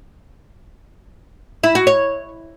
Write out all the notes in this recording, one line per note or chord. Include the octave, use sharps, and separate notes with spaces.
E4
F#4
C#5